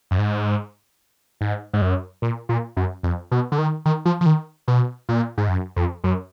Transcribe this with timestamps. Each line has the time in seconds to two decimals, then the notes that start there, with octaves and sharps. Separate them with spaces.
0.11 F#2
0.18 G#2
1.41 G#2
1.73 G#2
1.82 F#2
2.22 A#2
2.49 A#2
2.77 F#2
3.03 F2
3.31 B2
3.52 D3
3.58 D#3
3.85 D#3
4.05 F3
4.21 F3
4.26 D#3
4.68 B2
5.09 A#2
5.38 G#2
5.49 F#2
5.76 F2
6.04 F#2